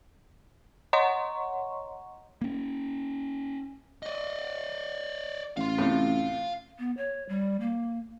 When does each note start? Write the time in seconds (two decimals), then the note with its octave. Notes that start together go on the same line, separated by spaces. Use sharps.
0.93 C#5 D#5 F#5 A#5 C6 C#6
2.42 A#3 C#4
4.03 D5 D#5
5.57 A1 F5 C6
5.78 A2 C3
6.79 B3
6.97 C#5
7.29 G3
7.60 A#3